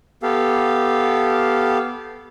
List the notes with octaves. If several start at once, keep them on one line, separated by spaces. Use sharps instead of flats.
B3 G4 A4 F5